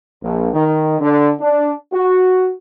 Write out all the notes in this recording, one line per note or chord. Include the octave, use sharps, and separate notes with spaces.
A#1
D#3
D3
D4
F#4